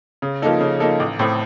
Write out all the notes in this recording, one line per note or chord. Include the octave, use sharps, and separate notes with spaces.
C#3
F3 A#3 D#4 A4
C#3
F3 A#3 D#4 A4
A1
A2 A3 C4